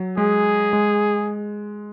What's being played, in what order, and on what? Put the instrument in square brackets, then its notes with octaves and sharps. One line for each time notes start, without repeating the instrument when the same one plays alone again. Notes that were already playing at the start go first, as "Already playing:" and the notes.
Already playing: [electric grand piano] F#3
[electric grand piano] G#3 [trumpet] G#4
[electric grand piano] G#3